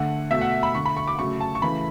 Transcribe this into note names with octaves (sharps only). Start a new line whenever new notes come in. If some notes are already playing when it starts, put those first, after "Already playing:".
Already playing: D3 A3 F#5
B2 A3 E5
F#5
B5
D3 A3 C#6
B5
C#6
D6
C#3 F#3 A3 C#6
A5
C#6
C#3 E3 A3 B5